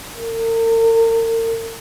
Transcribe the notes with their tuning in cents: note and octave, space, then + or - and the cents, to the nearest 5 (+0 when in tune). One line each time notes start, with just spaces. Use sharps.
A#4 -40